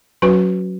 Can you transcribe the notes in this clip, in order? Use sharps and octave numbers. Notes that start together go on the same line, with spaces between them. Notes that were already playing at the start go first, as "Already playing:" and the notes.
F#3 C#4 F#4 B4